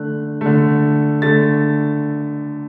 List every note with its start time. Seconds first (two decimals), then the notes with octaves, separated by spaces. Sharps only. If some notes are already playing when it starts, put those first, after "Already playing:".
Already playing: D3 A3 F#6
0.41 D3 A3
1.22 D3 A3 A6